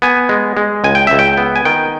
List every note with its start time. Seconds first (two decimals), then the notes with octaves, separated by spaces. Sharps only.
0.02 B3 G#5
0.29 G#3
0.57 G#3
0.84 C#2 G#5
0.95 G5
1.07 C#2 E5
1.19 G5
1.37 B3
1.56 G#5
1.65 D#3 G5